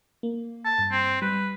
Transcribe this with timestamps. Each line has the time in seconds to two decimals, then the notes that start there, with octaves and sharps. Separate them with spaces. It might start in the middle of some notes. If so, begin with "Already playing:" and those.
0.23 A#3
0.65 A5
0.79 G2
0.91 C4
1.22 G3 B4